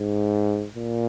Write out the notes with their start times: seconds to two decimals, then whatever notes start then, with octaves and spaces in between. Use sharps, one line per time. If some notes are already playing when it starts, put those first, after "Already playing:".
Already playing: G#2
0.76 A#2